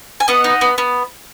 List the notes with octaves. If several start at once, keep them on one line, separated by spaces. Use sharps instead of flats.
G#5
B3 D#5 F#5
D#4
B3
B3